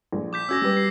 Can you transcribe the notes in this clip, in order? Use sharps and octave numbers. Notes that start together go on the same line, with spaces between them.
A#1
D6 G6 B6
C#4 F#4 E6 G#6 A#6
G3 G4 B4
C7